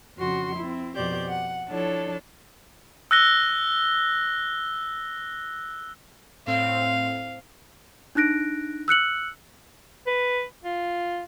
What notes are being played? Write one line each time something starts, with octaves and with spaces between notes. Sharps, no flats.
F2 C#3 F#4 C6
C4 E4
F2 B2 G4 C5 D5 G6
F#5
F3 D4 E4 A4 C#5
E6 F#6 A#6 G7
A2 C4 F5
D4 D#4 F#6 A#6 D7
E6 F#6 C#7 F#7
B4
F4